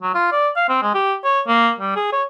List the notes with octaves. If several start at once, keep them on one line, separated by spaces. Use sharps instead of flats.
F#3
F4
D5
F5
C4
G#3
G4
C#5
A#3
G3
G#4
C#5